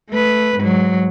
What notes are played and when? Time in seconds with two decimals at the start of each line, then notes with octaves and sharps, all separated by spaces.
0.10 A3 B4
0.58 G#2 F#3